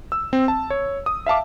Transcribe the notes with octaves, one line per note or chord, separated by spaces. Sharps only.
E6
C4
A5
C#5
D#6
E5 F5 A5 D6